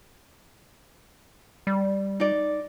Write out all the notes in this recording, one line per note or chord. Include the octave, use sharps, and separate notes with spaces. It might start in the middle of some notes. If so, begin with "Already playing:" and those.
G3
D#4 D5